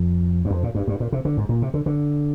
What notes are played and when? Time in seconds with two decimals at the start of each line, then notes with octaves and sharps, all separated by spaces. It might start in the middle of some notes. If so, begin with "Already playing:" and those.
Already playing: F2
0.45 G2
0.51 F2
0.63 A#2
0.75 G2
0.88 G2
1.00 A#2
1.12 C3
1.25 D3
1.37 G#2
1.49 A#2
1.62 C3
1.74 D3
1.86 D3